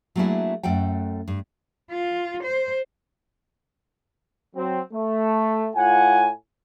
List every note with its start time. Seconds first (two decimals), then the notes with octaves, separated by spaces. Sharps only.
0.16 F#3 A3 A#3 D4 E4 G#4
0.63 F#2 A3 A4 F#5 G5
1.28 G2
1.91 F4
2.44 C5
4.56 F#3 C4
4.93 A3
5.76 A2 F4 F#5 G#5